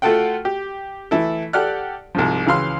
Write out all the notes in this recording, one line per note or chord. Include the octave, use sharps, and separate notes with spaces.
A3 F4 F#4 A4 F#5 G5
G4
E3 A3 E4 A4
G4 A4 D5 F#5 F6 F#6
C2 G#2 F3
C#2 E3 F5 C6 F6